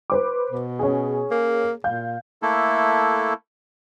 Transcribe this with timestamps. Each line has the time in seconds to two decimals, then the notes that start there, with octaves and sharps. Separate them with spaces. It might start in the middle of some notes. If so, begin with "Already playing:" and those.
0.10 B4 C5 D6
0.50 B2
0.79 C#4 G#4
1.31 A#3
1.84 A#2 F5 G6
2.42 A3 A#3 E4 A4